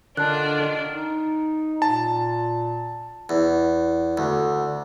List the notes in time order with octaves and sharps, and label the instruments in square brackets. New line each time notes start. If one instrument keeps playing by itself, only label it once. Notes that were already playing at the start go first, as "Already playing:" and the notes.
[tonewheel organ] D3 [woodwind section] D#3 F4 F5 [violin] D4 [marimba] A5 F#6
[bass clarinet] D#4
[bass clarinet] A#2 [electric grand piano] A5
[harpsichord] E2
D2